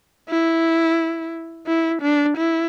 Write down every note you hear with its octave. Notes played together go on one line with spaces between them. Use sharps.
E4
E4
D4
E4